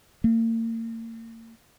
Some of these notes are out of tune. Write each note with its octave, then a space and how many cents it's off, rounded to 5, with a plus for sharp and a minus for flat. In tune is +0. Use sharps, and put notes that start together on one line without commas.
A#3 -40